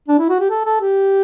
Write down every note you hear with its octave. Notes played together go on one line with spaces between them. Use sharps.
D4
E4
F#4
G4
A4
A4
G4